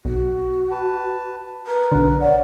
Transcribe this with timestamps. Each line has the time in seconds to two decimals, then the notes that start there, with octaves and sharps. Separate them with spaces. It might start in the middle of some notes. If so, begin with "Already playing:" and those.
0.05 B1 F#4
0.71 B4 A5
1.67 A#4 B4
1.92 B1 D3
2.21 C#5 D5 F#5